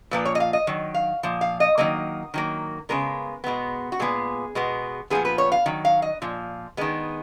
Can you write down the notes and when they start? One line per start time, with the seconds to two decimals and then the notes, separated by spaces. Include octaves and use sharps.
0.11 A#2 F3 A#3 B4
0.25 C#5
0.35 D#5
0.40 F5
0.53 D#5
0.67 D#3 F#3
0.94 F5
1.23 A#2 F3
1.41 F5
1.60 D#5
1.78 D#3 F#3 A#3 D#5
2.34 D#3 F#3 A#3
2.89 C#3 G#3 B3 A#4
3.44 B2 G#3 B3
3.92 F#4
4.00 A#2 G#3 B3 G#4
4.55 B2 G#3 B3
5.10 A#2 F3 B3 G#4
5.25 B4
5.38 C#5
5.52 F5
5.66 D#3 F#3
5.85 F5
6.02 D#5
6.22 A#2 F3
6.77 D#3 G#3 B3